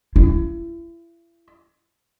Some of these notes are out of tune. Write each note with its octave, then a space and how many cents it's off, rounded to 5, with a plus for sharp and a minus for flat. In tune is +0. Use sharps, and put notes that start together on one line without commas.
E4 +35